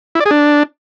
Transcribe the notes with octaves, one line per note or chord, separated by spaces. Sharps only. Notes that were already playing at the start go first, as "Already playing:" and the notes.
E4
D5
G#4
D4